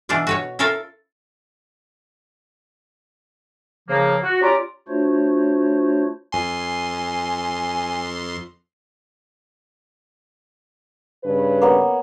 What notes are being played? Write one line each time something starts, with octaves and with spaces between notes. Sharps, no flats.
B2 E3 D4 E4 F4 D5
F#4 B4 C#5
E4 F4 A4 A#4 E5 F5
C#3 F3 A#3
F#4
C#4 F4 G4 D5 A#5
A3 D4 F4 F#4 C5 C#5
F2 G#5 C6
G2 C#3 B4
A#3 B3 C#5